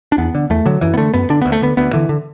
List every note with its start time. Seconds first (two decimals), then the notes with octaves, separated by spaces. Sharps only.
0.12 D4
0.18 E2 B3
0.35 D3
0.50 E2 A3
0.66 D3 F#3
0.81 F#2 E3
0.94 B3
0.98 D3 A3
1.14 F#2 B3
1.30 D3 D4
1.41 D2 B3
1.52 A3
1.62 D3 B3
1.77 D2 B3
1.93 D3 E3
2.09 D3